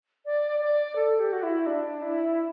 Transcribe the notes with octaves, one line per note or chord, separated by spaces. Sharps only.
D5
D5
A4
G4
F#4
E4
D4
E4